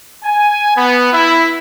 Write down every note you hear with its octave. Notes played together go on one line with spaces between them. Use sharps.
G#5
B3
E4